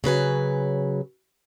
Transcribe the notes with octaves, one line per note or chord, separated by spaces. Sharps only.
C#3 F#3 B4 G#5